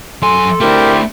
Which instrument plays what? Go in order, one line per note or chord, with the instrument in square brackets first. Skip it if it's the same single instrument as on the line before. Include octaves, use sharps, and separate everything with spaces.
[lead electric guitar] F#2 G#5 [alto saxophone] A4 [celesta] C6
[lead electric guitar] A3 D4 [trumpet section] C4 E4 G4 [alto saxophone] A#4